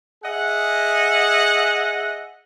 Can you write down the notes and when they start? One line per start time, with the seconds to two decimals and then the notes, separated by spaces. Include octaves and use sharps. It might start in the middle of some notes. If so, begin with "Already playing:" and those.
0.24 G#4 D#5 E5 F#5